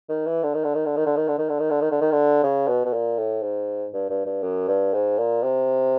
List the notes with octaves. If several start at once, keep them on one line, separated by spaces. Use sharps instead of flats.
D#3
E3
D3
D#3
D3
D#3
D3
D#3
D3
D#3
D3
D#3
D3
D#3
D3
D#3
D3
D#3
D3
C#3
B2
B2
A#2
A2
G#2
G2
G2
G2
F#2
G2
G#2
A#2
C3